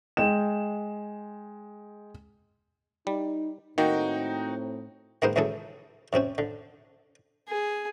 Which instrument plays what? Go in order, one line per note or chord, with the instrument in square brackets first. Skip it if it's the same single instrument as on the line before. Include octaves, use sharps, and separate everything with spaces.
[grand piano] G#3 G5 E7
[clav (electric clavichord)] G3 [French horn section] D#4
[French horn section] A2 C4 [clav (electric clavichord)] D#3 A#3 [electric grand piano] D#4 F#4 G5
[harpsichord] D#3 G#3 A#3 B3 A#4 C5
C#2 E3 F#3 G#4 A4
F#2 C3 C4 C#4
D3
[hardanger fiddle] G#4